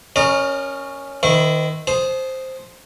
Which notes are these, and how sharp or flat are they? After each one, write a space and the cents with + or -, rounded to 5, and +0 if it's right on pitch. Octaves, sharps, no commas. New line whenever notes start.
C#4 +0 A#4 +10 D#5 -40
D#3 +0 E4 +0 C5 -40
C5 +0 A5 -45 D#6 +0